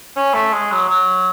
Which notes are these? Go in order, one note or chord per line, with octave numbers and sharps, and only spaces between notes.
C#4
A3
G#3
F#3
F#3